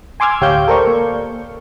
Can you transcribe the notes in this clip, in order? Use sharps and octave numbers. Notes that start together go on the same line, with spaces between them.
G#5 C6 D6 E6 F6 G#6
A1 D2 G4 C#5 F5 G6
A4 A#4 C5 D5 C#6
A#3